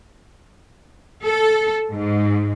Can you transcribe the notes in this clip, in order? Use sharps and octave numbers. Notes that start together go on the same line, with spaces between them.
A4
G#2